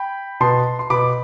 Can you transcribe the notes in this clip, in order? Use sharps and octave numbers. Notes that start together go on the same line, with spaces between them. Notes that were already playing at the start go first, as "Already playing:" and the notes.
Already playing: G5 B5
B2 B3 A5 C6
C6
B2 B3 B5 D6